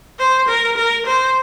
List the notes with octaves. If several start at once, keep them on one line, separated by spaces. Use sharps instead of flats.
C5
A#4
A#4
C5